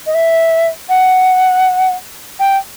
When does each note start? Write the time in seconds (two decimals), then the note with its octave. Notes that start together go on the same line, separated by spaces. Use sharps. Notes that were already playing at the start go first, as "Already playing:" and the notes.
0.06 D#5
0.14 E5
0.89 F#5
2.39 G5